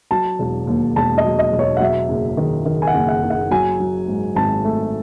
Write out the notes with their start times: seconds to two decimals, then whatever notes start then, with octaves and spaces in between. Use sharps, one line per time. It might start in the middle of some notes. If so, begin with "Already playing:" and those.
0.11 F#3 A5
0.39 E1
0.67 D#2
0.96 E1 A5
1.18 D#5
1.25 F#3
1.39 D#5
1.52 E1
1.59 C#5
1.77 F#5
1.80 F#3 E5
2.09 F#1
2.37 D#3
2.65 D#3
2.82 G#5
2.87 F#5
2.94 F#1
3.09 F#5
3.22 F#1
3.30 F#5
3.51 F#3 G#5
3.80 F#3
4.08 G#2
4.36 G#1 A5
4.65 A3